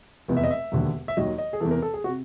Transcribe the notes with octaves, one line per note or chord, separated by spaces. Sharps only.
F1 E2 C3
E5
D#5
E5
E1 D#2 D3
E5
D#2 D#3 F#3 D#5
D#5
G#4
E2 C3 E3 A4
A#4
A4
G#4
C3 F#4